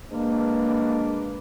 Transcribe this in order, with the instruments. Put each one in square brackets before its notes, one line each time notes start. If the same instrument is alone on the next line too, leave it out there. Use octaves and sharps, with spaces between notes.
[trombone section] G#3 D4 B4 [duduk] A#3